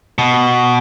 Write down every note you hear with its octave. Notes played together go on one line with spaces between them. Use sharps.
B2